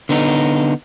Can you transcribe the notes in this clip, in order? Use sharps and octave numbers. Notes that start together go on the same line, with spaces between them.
D3 B3 D#4